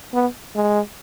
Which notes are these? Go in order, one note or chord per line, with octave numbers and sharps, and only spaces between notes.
B3
G#3